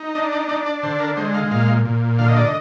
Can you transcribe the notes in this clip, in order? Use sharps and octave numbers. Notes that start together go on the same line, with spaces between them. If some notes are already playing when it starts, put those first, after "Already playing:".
Already playing: D#4
D4 D#5
D5
D4 D5
D5
D3 C5
A#4
G#3 C5
F5
A#2 F5
A#2
D3 F5
D#5
D5
D#5